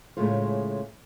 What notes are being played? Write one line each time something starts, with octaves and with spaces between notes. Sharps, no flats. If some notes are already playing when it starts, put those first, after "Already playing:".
A2 C#3 G#3 A3 F4 C5